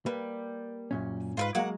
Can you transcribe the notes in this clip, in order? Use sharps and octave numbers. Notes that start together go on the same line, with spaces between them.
G3 A#3 B4
F#2 A#2 C#4
G#2 F4 A#4 B4
F#3 G#3 A#3 F#5 A#5